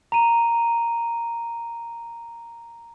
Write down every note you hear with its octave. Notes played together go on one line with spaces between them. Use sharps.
A#5 D#7